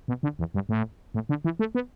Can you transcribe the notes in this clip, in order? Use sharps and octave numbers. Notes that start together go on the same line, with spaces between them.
B2
D3
E2
G2
A2
A2
D3
E3
A3
B3